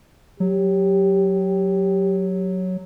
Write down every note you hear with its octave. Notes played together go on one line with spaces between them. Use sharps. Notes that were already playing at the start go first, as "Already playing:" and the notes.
F#3 G4